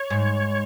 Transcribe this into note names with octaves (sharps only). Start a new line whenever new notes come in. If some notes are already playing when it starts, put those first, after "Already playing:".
Already playing: C#5
G#2